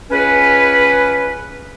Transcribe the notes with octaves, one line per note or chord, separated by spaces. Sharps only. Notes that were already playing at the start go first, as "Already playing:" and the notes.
C#2 C#4 B4